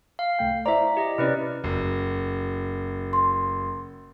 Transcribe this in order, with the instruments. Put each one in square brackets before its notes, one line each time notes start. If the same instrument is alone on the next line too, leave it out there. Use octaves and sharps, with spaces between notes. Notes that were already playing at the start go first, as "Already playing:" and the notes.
[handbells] F5
[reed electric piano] C2 A3 G5
[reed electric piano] E4 C5 D5 [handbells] E5 A#5
[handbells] G4 D#5
[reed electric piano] C3 C#4 [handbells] E4 B4 D5
[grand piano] F#1
[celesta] C6